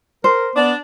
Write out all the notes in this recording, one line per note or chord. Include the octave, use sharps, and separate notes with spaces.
A#4 C5
B3 D4